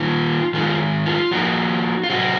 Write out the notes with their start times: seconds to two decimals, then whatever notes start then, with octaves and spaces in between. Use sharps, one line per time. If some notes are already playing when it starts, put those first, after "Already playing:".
Already playing: D#3 A#3 D#4 F4
0.54 D#3 G#3 D#4 F4
1.06 F4
1.31 F3 A#3 D#4 F#4
2.04 F4
2.10 C3 F#3 C4 F#4